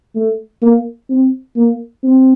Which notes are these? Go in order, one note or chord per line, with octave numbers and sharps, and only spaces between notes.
A3
A#3
C4
A#3
C4